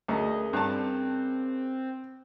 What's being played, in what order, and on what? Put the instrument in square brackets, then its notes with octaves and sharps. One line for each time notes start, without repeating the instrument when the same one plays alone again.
[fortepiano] D2 [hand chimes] C#4 G#4 A#4 [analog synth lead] D#5
[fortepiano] G2 A5 [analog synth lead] C4